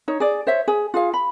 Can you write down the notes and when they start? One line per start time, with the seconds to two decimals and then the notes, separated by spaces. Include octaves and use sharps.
0.08 D#4 C#5
0.20 G#4 D5
0.47 C5 C#5 E5
0.68 G#4
0.94 F4 G#4 F5
1.14 B5